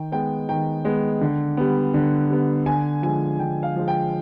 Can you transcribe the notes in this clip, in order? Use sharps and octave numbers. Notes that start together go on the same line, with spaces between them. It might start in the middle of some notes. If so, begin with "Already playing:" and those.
Already playing: D#3 G5
G#3 B3 G5
D#3 G5
G#3 B3
D3
G3 B3
D3
G3 B3
D3 G#5
F3 G#3 G#5
D3 G5
F5
F3 G#3
G5